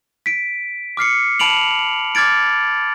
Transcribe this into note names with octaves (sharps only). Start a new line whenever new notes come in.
B6 D7
D6 F6 C7 C#7
A5 B5 D7 F7 F#7
D6 F6 G#6 A6 D7